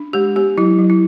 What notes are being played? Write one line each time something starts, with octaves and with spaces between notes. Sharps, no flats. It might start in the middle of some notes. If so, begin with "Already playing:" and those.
Already playing: D4
G#3 G4
B3 G4
F#3 E4
F#3
E4